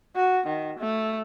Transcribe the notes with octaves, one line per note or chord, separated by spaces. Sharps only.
F#4
D#3
A3